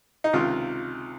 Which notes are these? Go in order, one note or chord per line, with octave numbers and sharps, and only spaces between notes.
D#4
C#2 C3 D#3 F4